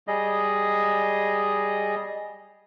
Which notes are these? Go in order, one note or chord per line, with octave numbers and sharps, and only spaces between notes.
G3 G#4 D#5